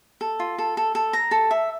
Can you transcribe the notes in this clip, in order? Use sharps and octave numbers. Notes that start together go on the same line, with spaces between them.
A4
F4
A4
A4
A4
A#5
A4
E5